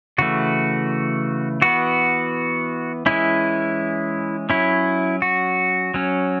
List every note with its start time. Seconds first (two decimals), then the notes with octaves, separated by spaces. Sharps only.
0.18 C#3 E3 A3 F#4
1.62 E3 B3 F#4
3.06 E3 G#3 C#4 E4
4.50 F#3 C#4 E4
5.22 F#4
5.94 F#3 C#4